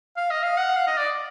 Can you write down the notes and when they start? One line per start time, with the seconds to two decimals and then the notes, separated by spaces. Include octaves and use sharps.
0.17 F5
0.31 D#5
0.43 F5
0.57 F#5
0.76 F5
0.87 D#5
0.98 D5